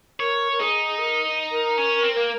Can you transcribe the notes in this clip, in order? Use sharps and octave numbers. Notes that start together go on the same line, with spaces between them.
A#4 C#5
A#4
D#4 G#4
A#4
A#4
C#4
C4
A#3